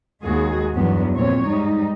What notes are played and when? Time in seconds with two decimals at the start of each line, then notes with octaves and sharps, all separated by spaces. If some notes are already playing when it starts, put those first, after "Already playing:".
0.23 D#2 G#3 F#4 G#4
0.74 E2 G2 F#3 B3
1.14 F2 A#2 C4 C#5
1.47 G#2 G3 D#4